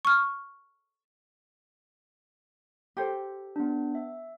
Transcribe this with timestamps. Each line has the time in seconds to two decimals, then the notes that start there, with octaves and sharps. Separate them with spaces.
0.05 C#6 F6
2.97 G4 A4 C5
3.56 B3 D4
3.95 E5